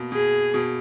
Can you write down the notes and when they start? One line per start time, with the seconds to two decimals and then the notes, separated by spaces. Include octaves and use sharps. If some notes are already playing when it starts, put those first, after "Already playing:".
Already playing: B2 A#3
0.12 B2 G#4
0.54 B2